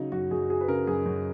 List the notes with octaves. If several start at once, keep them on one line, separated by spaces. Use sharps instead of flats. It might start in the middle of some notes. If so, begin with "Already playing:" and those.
Already playing: C#3 F#3 D#4
F#2 F#4
F#2 G#4
F#3 G#4
B4
C#3 A#4
F#2 G#4
F#2